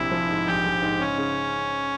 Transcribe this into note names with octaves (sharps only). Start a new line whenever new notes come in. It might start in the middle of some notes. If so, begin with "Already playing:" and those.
Already playing: A#1 C3 E4
F3
G#2
A#1 G4
A#1
G#2
C#3 C#4
C#3